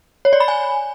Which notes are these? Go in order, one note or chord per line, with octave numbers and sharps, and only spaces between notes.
C#5
D5
B5
G#5